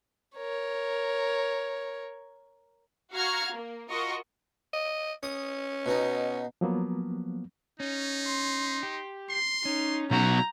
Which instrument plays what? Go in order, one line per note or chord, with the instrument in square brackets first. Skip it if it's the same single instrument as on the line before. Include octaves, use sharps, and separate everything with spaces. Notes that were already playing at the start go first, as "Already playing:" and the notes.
[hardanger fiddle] A#4 C#5
[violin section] F#4 F5 A#5 F6 G#6
A#3
F4 F#4 A#4 D#5 C#6
[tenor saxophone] D#5
[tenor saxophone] C#4 [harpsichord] D#6
[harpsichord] B2 D#4
[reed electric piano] F3 F#3 A#3 B3
[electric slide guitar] C#4 [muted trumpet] D#4
[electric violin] C6
[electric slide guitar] G4
[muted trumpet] C6 [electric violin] C7
[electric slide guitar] C#4 [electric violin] D#4
[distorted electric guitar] B1 F#4 [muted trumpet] E4 [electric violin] A#5 G6